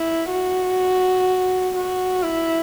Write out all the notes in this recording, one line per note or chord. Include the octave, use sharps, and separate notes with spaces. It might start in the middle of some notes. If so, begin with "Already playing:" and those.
Already playing: E4
F#4
F#4
E4